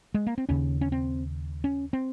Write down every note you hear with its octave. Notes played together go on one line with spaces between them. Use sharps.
G#3
A#3
C4
D#2 C#3 C#4
C#4
C4
C#4
C4